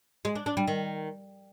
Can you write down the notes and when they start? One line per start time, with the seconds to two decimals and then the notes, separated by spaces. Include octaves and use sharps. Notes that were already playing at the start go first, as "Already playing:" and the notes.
0.25 G#3
0.35 D4
0.46 D4
0.57 G3
0.68 D#3